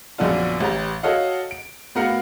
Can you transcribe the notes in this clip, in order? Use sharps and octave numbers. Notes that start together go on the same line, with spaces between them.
A#1 F#2 D3 B3 D4 F4
A1 G4 A#5
F#4 A4 C#5 D#5 F5 F#5
D7
A2 B3 F#4 A#4 F5 C#7